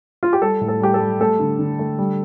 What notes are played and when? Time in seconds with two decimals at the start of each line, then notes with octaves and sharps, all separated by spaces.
0.23 F4
0.33 G4
0.42 G3 A4
0.61 A2
0.68 A4
0.81 G3 G4
0.94 A4
1.00 G3
1.20 A3 A4
1.40 D3
1.59 D3
1.79 A3
1.98 G3